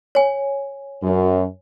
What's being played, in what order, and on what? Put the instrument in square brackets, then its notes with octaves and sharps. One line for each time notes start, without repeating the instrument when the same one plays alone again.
[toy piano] C#5 G#5
[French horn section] F#2